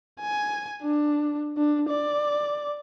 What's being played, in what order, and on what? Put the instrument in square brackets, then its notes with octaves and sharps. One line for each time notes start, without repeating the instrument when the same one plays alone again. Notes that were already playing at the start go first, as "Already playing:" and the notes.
[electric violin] G#5
D4
D4
D5